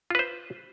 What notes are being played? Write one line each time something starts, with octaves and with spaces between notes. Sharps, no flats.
F4 B4 C5